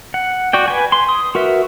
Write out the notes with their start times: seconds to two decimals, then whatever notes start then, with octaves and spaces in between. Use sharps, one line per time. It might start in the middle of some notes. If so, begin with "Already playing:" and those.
0.14 F#5
0.53 F#4 D5 G5
0.68 B4 G#5
0.92 C6
1.09 D#6
1.35 F#4 A#4 B4 E5